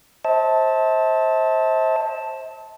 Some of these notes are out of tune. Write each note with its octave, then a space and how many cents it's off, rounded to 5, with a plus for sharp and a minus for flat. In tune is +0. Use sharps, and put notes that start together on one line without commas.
C5 +20 E5 -45 A5 +0